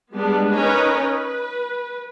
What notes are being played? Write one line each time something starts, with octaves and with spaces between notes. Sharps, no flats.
G3 G#3 B3 D4
C#4 D#4 A#4 B4 C#5 D#5
B4